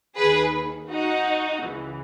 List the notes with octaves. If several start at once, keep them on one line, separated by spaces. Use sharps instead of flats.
D#2 D#3 G#4 B4
D#4 F#4
C#2 C#3 E3